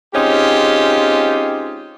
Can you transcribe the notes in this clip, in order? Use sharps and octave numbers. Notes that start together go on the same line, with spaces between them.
G#3 C4 C#4 D#4 F4 G4